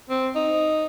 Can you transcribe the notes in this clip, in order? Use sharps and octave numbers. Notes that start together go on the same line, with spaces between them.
C4
D#4